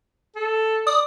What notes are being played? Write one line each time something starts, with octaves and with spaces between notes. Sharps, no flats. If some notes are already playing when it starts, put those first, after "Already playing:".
A4
D5 D#6